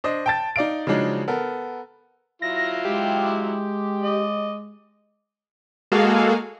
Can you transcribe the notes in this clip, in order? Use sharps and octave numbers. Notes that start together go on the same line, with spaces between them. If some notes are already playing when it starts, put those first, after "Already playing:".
D4 C5 D#5
G5 A5 A6
D#4 D5 F5 D7
C#3 F3 F#3 G#3 D4 D#4
B3 A4 A#4
F#3 E4 F4 A#6
G#3 G4
D#5 D6
G#3 A#3 F#4 G#4 A4 F5